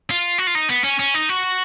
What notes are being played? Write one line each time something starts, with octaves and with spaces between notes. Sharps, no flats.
F4
F#4
F4
D#4
B3
C#4
C#4
D#4
F#4